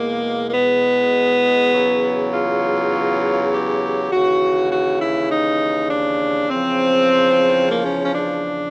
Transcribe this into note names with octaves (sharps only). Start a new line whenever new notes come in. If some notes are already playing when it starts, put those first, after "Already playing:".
Already playing: E2 B2 G#3 A#3
A#3
B3
E2 C#3 F#3
F4
G4
D#2 C#3 E3 F#4
F#4
E4
D#4
D4
E2 C#3 F3 C4
A#3
C#4
C#4
D4